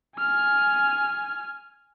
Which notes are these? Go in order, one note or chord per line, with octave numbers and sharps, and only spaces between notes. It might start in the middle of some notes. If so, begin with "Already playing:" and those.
G#5 F6